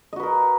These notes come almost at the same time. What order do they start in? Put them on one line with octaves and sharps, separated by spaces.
D#5 F#4 B4 A#4